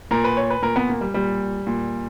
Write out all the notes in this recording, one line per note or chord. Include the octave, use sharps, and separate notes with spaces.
A#2 A#4
B4
C#5
B4
A#2 A#4
B3
A#3
G3
A#2 G3
A#2